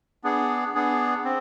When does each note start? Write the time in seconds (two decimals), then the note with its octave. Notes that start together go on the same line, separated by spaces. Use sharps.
0.24 B3 D4 G#4
0.74 B3 D4 G#4
1.24 C4